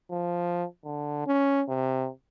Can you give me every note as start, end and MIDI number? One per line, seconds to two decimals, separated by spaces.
0.10 0.64 53
0.85 1.26 50
1.26 1.63 61
1.68 2.08 48